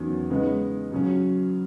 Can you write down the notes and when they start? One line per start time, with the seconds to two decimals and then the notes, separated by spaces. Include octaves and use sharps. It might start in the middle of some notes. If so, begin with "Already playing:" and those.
Already playing: E2 D#3 F#3 C#4
0.30 C#3 G#3 B3 D#4
0.92 F#2 C#3 F#3 C#4